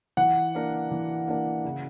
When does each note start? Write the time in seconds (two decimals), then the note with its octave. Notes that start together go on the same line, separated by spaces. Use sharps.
0.17 E3 F#5
0.54 A#3 D4 A#4
0.91 E3
1.27 A#3 D4 A#4
1.65 C#3